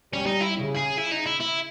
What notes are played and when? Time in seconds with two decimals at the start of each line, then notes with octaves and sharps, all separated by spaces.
0.13 G3 C#4
0.26 D#4
0.40 E4
0.55 C#3
0.76 G#4
0.97 E4
1.11 D#4
1.26 E4
1.40 E4